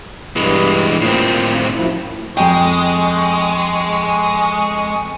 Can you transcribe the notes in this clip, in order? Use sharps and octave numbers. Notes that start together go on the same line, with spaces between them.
G2 E3 G#3
A2 A#3 C4 F4
F#2 F3 E4
F2 G#3 G5 C#6